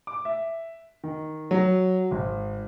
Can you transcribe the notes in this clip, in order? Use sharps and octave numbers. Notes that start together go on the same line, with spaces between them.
D6
E5
D#3
F#3
G#1